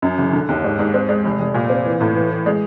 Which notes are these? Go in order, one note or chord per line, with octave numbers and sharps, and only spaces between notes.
F#2
F#1
D3
D#2
G#2
G#2
C4
G#3
F1
F1
A#2
C4
E3
A2
E3
E3
G#3